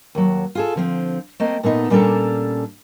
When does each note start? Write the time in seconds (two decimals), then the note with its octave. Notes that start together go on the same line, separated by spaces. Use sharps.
0.15 D#2 F#3
0.55 F4 G#4 A4
0.76 D3 F3 C4
1.40 A3 A#3 C4 D#5
1.63 A#2 A3 B3 D#4
1.90 A#2 G3 C#4 D4 A4 A#5